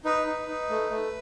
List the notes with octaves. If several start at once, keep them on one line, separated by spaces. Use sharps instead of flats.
D#4 B4
D#4
D#4
A3
A3